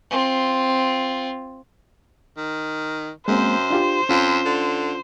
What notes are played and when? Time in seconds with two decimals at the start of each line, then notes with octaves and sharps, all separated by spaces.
0.10 C4 F4
2.37 D#3
3.28 F#2 G#3 A#3 C4 C5
3.70 D4 F4 G4
4.09 F2 C#4 F4
4.45 D3